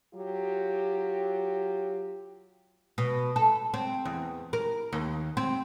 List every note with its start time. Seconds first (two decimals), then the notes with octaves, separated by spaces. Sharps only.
0.14 F#3 F4 G4
2.98 B2
3.36 A4
3.74 C4
4.05 E2
4.53 A#4
4.93 D#2
5.37 C4